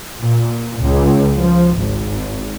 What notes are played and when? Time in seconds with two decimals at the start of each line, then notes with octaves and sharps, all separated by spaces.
0.20 A#2
0.81 C#2
1.37 F3
1.78 G#1